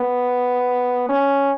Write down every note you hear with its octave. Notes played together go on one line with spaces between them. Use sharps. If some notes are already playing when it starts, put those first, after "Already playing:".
Already playing: B3
C#4